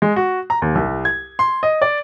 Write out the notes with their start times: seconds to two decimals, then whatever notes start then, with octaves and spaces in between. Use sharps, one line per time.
0.02 G#3
0.16 F#4
0.50 A#5
0.62 D#2
0.75 C2
1.05 G#6
1.39 C6
1.63 D#5
1.82 D5